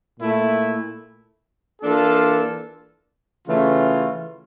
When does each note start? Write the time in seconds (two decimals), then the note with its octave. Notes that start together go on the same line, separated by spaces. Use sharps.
0.18 A#2 A3 E4
1.82 E3 A#3 D4 F4 A4
3.47 C#3 E3 A3 C#4 F4